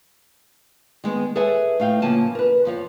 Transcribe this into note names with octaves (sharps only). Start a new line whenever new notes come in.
D#3 G#3 B3
G#4 A4 B4 C#5 E5 G#5
A2 F5 G5
C#3 F3 A#3 G#5 A5
A#4 B4
F2 F3 C#5